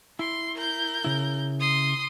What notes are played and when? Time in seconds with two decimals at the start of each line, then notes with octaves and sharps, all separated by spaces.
0.19 E4 C6
0.55 A#4 G6
1.05 C#3 E4
1.60 C6 D#6